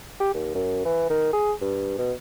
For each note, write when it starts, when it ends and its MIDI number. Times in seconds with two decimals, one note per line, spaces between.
0.20 0.33 67
0.34 0.50 39
0.55 0.82 42
0.85 1.08 52
1.10 1.28 51
1.33 1.53 68
1.61 1.94 43
1.98 2.12 47